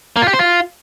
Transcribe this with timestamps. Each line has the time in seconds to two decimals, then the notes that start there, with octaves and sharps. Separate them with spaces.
0.16 A#3
0.22 F4
0.28 G4
0.33 C5
0.39 F4